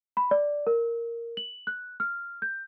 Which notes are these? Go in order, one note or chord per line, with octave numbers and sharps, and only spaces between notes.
B5
D5
A#4
F#7
F#6
F6
G6